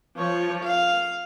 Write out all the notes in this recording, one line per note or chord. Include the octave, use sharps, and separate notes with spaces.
F3 C#5
F5